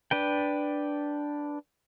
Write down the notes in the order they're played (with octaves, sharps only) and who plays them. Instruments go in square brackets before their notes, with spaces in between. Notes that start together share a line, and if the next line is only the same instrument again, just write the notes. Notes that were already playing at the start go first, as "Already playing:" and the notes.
[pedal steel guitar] D4 B4 G5